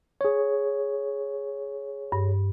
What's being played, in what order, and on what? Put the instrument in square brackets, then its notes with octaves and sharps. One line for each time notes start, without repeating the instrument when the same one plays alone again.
[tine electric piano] G#4 C#5
[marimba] G2